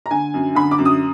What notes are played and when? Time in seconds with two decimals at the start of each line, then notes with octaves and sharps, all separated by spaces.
0.06 A#5
0.11 D3 G#5
0.34 F#2
0.55 D3 B5
0.71 D6
0.78 F#2
0.85 D#6